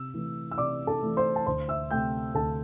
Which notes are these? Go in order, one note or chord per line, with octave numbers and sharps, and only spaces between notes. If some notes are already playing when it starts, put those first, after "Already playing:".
Already playing: C3 E6
E3 A3
E6
C3 D5 D6
A4 A5
E3 A3
C5 C6
A5
D2 C5 C6
E5 E6
C3 A3 G5 G6
D2 A4 A5